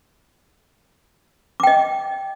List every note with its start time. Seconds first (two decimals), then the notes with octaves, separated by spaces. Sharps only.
1.60 D6
1.63 G5
1.67 D#5